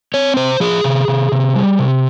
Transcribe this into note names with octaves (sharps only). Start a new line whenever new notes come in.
C4 C#5
C3 C5
F3 G#4
C3
C3
C3
G3
C3